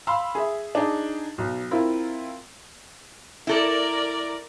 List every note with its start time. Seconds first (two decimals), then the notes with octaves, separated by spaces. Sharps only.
0.07 F5 B5 C6 E6
0.35 G#4 E5
0.75 D4 D#4 G#4
1.38 B1
1.71 C4 E4 F4 A#4
3.47 E4 A4 A#4 D5